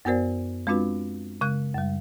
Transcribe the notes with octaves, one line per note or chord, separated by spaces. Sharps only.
F#2 B3 F#4 A#4 C5 D5
G#3 C4 D4 F4 F#4 B4
C#3 G#3 F#6
F#2 G3